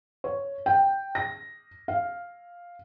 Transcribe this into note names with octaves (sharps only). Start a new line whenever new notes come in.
C#5
G5
A#6
F5